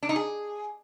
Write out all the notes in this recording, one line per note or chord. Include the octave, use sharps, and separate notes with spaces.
D4
D#4
G#4